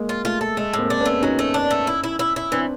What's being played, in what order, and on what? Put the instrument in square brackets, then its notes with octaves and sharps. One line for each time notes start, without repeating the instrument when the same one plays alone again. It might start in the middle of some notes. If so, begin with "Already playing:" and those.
Already playing: [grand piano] G#3 A#3
[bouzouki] F4
[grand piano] A3 [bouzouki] F4
[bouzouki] A4
[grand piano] G#3 [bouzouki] A3
[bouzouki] A2
[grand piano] A#3 C4
[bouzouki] D4
[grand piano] B3 C#4
[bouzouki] A3
[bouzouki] F#3 [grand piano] C#4 D#4
[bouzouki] A3
D4
A3
E4
E4
E4
E4
[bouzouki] E3 [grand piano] C4 D4